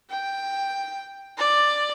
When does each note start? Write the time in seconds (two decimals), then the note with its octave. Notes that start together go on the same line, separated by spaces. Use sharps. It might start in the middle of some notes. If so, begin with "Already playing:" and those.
0.11 G5
1.38 D5